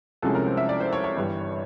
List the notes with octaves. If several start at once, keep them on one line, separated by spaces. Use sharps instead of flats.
C2 C3 F3 G#3 C#4 A4
A#4
C5
E5
D5
C5
C#5
C#5
G1 G2 E3 G3